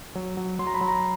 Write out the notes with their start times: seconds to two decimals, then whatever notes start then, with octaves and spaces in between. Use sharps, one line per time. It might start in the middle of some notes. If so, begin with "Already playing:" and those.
0.15 F#3
0.37 F#3
0.59 F#3 C6
0.67 A#5
0.74 B5
0.81 F#3
0.88 A#5